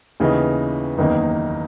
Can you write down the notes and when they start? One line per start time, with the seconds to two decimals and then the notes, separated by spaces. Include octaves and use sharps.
0.20 D#2 C#3 E3 B3 D#4
0.98 F#1 E2 D#3 A#3 D#4